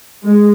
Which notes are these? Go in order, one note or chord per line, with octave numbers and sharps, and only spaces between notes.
G#3